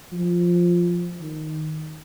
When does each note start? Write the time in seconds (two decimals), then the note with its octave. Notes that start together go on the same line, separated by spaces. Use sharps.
0.12 F3
1.21 D#3